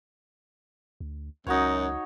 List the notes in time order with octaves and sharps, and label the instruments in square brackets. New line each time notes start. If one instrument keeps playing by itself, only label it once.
[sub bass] D2
[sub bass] C#2 [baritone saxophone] F#2 [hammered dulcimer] D#4 F#4 C#5